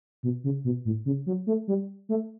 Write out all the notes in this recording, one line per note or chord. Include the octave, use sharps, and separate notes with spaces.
B2
C#3
B2
A2
C#3
F#3
A3
G3
A3